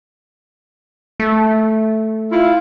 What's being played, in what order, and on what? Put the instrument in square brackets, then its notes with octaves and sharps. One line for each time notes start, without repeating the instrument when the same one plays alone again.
[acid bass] A3
[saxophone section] E4 F4